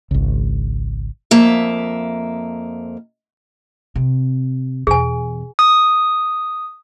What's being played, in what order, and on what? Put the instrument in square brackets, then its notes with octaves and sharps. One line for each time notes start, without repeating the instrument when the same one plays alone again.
[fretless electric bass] G#1 C#2
[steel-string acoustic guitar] F2 A#3 E5
[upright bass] C3
[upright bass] E2 B2 [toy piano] G#4 G#5
[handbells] D#6